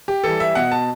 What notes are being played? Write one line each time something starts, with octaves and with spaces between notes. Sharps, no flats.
G4
E3 G3 A4
E5
B2 F#5
A5